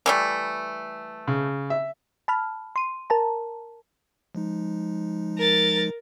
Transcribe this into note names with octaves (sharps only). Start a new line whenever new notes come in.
E3 G3 A3
C#3
E5
A5 B5 F6
C6 D#7
A#4 A5 A#5
F3 G#3 D#4
A#4 A6